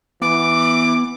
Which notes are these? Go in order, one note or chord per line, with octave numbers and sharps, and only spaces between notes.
E3 B3 D6